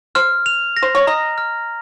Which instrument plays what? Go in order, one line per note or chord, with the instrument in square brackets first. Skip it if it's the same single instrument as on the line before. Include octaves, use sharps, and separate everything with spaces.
[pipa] C5 [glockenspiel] F6
[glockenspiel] F7
A#6
[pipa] C5
C#5
[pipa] D#5 [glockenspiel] A#5
[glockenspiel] F6